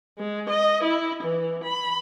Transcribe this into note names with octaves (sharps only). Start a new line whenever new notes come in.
G#3
D#5
E4
E3
B5